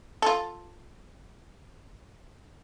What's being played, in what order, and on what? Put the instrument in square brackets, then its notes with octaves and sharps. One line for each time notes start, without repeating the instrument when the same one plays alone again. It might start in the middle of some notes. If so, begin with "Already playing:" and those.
[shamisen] F4 A4